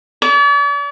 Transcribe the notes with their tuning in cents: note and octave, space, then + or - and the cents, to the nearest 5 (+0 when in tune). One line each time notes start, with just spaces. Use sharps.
D5 -45